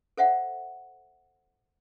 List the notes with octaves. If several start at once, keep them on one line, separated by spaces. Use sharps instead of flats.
A4 C5 E5 F#5